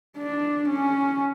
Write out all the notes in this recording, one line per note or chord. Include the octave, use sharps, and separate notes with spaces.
D4
C#4